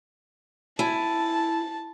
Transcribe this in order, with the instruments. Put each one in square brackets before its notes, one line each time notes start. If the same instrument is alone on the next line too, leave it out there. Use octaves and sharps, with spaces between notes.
[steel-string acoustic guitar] E4 G#5 [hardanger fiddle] A5